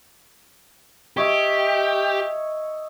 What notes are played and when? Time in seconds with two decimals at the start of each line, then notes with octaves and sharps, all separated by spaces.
1.17 G4 C#5 D#5 E5